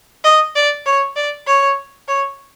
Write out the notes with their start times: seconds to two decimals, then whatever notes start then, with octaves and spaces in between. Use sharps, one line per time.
0.24 D#5
0.56 D5
0.86 C#5
1.16 D5
1.47 C#5
2.08 C#5